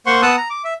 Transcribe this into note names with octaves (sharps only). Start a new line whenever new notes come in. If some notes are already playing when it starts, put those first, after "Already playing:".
A#3 C5 F#5 C6 C#6
B3 F#5 A5 D#6 E6 F#6
A#5
D6
E5